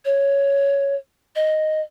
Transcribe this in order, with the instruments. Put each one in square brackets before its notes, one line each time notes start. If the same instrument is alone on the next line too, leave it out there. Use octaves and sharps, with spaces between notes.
[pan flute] C#5
D#5